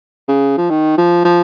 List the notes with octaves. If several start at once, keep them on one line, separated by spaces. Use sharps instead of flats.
C#3
F3
D#3
F3
F3